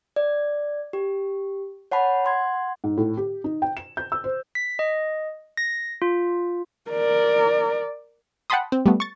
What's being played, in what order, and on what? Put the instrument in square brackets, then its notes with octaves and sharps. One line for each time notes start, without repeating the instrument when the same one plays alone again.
[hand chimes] D5
G4
C#5 F#5 A5 B5
F#5 C6 G#6
[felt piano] G#2
A2
G4
D#4
G5
E7
G6
E6
C5
[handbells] B6
D#5
A#6
F4
[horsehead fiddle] A#4 D5
[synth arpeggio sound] F#5 G5 A5 B5 C6 D#6
C4
G3 A3 B3
C#6 A6